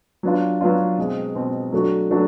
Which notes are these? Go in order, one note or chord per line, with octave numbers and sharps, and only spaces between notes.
F#3 B3 D4 F4
F#3 B3 D4 F4
B2 G#3 C4
B2 G#3 C4
F#3 A3 D4 F#4
F#3 A3 D4 F#4